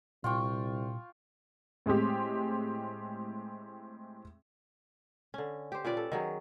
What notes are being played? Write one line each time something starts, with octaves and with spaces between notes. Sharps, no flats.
C2 A#2 F4 G5 C#6
A2 G#3 C4 G4
D3 C#4
G4 C5
A#2 C#4 B4 D5
A4
D#3 F#3 G#4